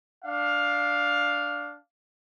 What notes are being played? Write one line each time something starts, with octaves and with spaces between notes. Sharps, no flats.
D4 F5